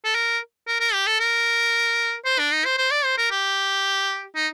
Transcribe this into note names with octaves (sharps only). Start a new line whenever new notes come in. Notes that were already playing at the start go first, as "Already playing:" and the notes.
A4
A#4
A#4
A#4
G4
A4
A#4
C5
D4
D#4
C5
C5
D5
C5
A#4
G4
D#4